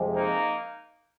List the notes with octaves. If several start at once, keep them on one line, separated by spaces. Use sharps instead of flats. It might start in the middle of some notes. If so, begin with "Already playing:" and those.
Already playing: F2 C3 G#3
A#3 D#4